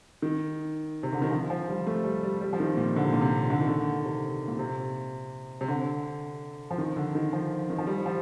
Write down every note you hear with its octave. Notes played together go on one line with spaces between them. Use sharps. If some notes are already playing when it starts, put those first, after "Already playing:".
D#3
C3
D3
D#3
F3
F3
G3
A3
G3
G3
G3
F3
D#3
A#2
D3
C3
A#2
C3
D3
D#3
D3
C3
A#2
C3
C3
D3
F3
D#3
D3
D#3
F3
D#3
F3
G3
F3